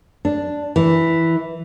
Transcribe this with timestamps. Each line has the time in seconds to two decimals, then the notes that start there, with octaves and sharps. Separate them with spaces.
0.25 D4
0.76 E3